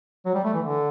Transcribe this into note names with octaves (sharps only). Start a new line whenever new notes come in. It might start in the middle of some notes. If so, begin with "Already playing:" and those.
F#3
G3
A3
E3
D3